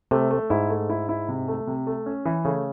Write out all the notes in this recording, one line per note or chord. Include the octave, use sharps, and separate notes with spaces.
C3 A3
A3
G#2 E4
A3
E4
E4
C3
A3
C3
A3
C#4
E3
C#3 A3